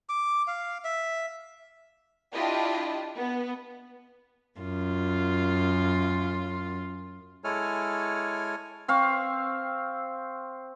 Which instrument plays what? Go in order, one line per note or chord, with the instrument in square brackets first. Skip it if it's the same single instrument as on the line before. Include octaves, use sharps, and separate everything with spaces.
[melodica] D6
F5
E5
[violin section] D4 E4 F4 G4 D#5
B3
[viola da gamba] F#2 F4
[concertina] G#3 E4 A4 C#5 G#5 F6
[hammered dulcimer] C4 F5 C#6